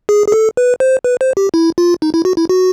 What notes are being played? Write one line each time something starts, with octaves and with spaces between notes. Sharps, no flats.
G#4
G#4
A4
B4
C5
B4
C5
G4
E4
F4
D#4
E4
F#4
E4
F#4